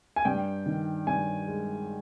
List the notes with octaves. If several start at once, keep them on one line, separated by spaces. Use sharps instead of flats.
G#5
G2 G5
D#3
G2 G#5
G#3